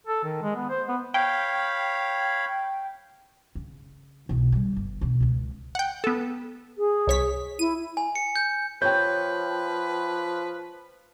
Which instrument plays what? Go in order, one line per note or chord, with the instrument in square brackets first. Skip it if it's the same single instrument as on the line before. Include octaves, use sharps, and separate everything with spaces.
[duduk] A4
D#3
G#3
B3
C5
B3
[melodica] C#5 F5 B5 [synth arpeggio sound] G5
[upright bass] C#3
B1 E4
C#3 G3
G1
B2 D3
C#2 G#3
[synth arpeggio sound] F#5 G5
B3 A4
[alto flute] G#4
[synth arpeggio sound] C2 C#5 B6
[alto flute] E4 [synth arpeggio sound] D#7
[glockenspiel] G#5
C#7
G6
[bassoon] F3 [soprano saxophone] B4 [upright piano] C#5 G5 [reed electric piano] G6